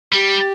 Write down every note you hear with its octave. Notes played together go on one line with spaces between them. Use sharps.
G3 G4